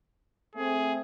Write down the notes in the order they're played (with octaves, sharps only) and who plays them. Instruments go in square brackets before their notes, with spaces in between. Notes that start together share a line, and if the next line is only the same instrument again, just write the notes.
[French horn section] A3 C4 [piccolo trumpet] G#4